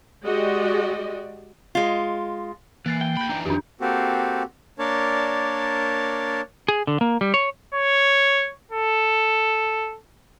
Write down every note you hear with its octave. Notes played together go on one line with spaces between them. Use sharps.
G#3 F#4 G4 D5 D#5
G#3 F4
E3 A#3 F#6 A6 C7
G5
D2 B5 G6 D7
D3 E3 A#5
F2 D#3 D4 G4
A#3 C4 F#4 G4 A4
A#3 D4 A#4 C#5 D5 A5
G#4
D3
A#3
G3
C#5
C#5
A4